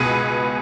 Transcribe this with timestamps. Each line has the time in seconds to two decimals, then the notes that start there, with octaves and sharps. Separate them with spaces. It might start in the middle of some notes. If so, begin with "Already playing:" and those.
Already playing: C#2 B2 G#4 B4